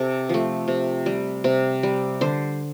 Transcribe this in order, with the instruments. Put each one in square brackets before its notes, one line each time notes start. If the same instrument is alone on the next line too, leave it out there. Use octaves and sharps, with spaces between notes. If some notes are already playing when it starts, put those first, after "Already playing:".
Already playing: [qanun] C3 A4
F3 A3
C3
G3
C3
G3
D3 C5